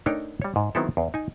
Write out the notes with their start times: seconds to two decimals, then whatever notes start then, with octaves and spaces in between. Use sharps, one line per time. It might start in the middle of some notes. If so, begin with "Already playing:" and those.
0.06 A3 D4 D#4 A#4 C#5 G5
0.42 G3 C#5
0.56 G#2
0.75 D#3 F#3 B3 C4 E4 A4
0.97 E2
1.14 D#4 G#5